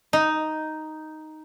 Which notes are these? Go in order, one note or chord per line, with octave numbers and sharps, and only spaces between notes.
D#4